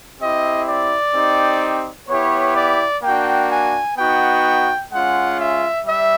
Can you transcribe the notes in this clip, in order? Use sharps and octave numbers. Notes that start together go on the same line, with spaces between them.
C4 E4 G4 D#5
D5
C4 D#4 G4
B3 E4 G4 C#5
D5
A#3 D4 F#4 G5
G#5
B3 D#4 F#4 G5
G#3 C#4 F4 F#5
E5
G3 E5